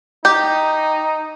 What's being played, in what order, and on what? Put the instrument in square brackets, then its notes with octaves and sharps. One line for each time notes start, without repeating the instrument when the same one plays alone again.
[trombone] D#4 [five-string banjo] G4